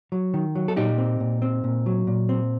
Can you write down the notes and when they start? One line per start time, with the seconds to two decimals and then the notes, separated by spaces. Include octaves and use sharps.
0.12 F#3
0.34 D#3
0.55 F#3
0.68 A4
0.76 A#2 D#4 G4
0.98 C4
1.20 A#2
1.42 C4
1.64 A#2
1.86 F#3
2.07 A#2
2.29 C4